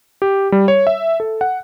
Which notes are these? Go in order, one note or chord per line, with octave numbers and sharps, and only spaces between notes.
G4
G3
C#5
E5
A4
F#5